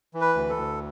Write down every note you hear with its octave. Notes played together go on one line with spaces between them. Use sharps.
E3
B4
D2
A4
D2